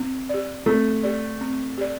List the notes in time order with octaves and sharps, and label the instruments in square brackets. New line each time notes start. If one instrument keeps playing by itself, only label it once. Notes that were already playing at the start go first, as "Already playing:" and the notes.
Already playing: [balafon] C4
G4 D5
[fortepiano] A3 [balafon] C4
[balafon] G4 D5
C4
G4 D5